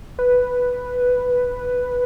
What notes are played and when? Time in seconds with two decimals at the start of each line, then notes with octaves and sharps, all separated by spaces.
0.19 B4